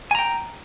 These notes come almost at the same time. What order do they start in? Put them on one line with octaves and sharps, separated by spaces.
G#5 A#5 G5